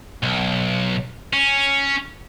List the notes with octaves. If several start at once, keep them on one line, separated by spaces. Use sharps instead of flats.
B1
C#4